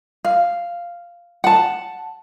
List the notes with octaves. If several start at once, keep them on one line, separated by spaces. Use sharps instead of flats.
F5
F#5 A5